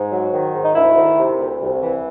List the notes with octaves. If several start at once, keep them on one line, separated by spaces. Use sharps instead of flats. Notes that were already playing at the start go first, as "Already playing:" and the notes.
Already playing: G#2
F#3
D#3
G#2
D#4
D2 E4
D#3
C3
D2
C2
E3